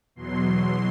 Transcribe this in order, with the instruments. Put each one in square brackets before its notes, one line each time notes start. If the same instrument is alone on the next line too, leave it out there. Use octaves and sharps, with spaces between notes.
[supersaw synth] E2 B2 F#3 C6